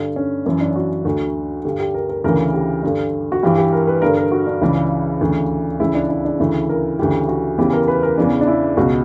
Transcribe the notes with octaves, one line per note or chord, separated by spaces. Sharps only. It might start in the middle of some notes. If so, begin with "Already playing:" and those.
Already playing: G2 D3
C#4
F#2 E3 C#4
D4
F#4
D2 D3 F#4
G2 D3 G4
G4
A#4
A#4
D2 C#3 E3 A#4
G4
G2 D3
F#4
G2 E3 G4
G4
A#4
B4
G2 D3 A#4
A#4
F#4
D4
C#2 C#3 E3
D2 C#3 E3
C#2 C#3 E3 E4
D4
D4
D4
D2 C#3 E3 E4
A#4
D2 C#3 E3 G4
F#4
E2 C#3 E3 G4
A#4
B4
A#4
E2 C#3 E3 D4
D4
E4
C#2 B2 F#4